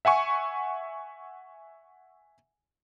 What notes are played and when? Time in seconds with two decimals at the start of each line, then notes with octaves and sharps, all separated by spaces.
0.05 E5 F#5 G#5 C#6